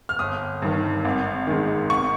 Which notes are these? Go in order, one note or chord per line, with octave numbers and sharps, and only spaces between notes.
F6
G1 D#6
G2 D#3
G#1
G#2 D#3
G#1 C#6